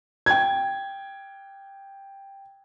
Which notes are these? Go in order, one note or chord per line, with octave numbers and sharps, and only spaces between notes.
G5 G#6